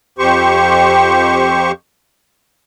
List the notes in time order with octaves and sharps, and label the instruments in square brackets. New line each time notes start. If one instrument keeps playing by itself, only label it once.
[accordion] F2 G4 C5 C#6